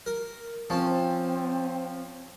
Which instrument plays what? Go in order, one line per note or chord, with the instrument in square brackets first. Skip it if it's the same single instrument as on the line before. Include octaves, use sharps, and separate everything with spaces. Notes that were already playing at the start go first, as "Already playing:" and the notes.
[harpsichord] A#4
[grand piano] F3 [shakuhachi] C4 [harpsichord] C#4 A5